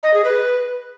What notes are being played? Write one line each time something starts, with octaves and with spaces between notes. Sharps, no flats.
D#5
G#4
B4